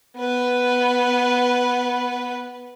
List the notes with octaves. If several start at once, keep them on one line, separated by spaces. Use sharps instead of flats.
B3 B4